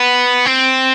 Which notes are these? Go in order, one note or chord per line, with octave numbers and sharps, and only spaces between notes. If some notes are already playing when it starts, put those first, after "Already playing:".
Already playing: B3
C4